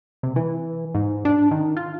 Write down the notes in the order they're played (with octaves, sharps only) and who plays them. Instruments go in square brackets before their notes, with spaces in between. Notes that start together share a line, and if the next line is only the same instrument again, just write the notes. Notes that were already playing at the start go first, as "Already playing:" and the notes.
[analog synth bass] C3
E3
G#2
D4
D#3
F4